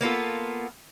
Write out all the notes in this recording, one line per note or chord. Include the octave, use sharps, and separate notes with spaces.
A#3 B3 F4 A4